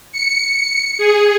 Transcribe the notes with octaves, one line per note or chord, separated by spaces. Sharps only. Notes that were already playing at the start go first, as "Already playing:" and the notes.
C#7
G#4